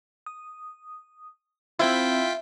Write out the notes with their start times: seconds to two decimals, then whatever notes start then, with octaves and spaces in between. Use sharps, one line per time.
0.26 D#6
1.79 C4 E4 F4 C5 E5 G5 B6